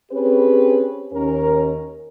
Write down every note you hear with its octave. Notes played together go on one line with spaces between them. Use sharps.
C4 C#4 G4 G#4 B4 C#5
D#2 C#4 A#4